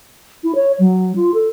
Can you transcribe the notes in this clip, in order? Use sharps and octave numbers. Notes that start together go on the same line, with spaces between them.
E4
C#5
F#3
F4
A4